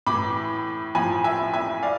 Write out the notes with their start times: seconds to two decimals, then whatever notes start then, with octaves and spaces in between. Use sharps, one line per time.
0.06 A2 E3 B5 D6
0.95 A2 F3 G#5 B5
1.24 E5 G#5
1.54 E5 G#5
1.83 D5 F5